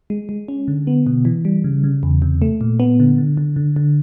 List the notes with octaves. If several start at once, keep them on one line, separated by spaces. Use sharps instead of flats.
G#3
G#3
C#4
D3
B3
B2
E3
G3
C#3
C#3
E2
C3
A3
A#2
B3
D3
D3
D3
D3
D3